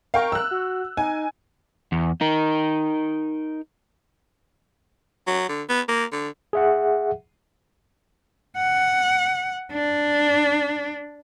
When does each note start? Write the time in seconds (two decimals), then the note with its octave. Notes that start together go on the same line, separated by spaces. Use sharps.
0.14 A#4 F5 G5 C#6
0.32 E6 F#6
0.51 F#4
0.97 D#4 G#5
1.92 E2
2.21 D#4 A#4
5.27 F#3
5.49 D3
5.69 B3
5.88 A#3
6.12 D3
6.53 G#4 E5 F#5
8.58 F#5
9.72 D4